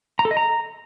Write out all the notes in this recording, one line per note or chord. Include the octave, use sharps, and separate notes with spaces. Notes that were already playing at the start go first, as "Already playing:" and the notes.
A#5
A4
D#5
A#5